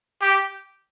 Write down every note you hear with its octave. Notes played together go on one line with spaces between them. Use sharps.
G4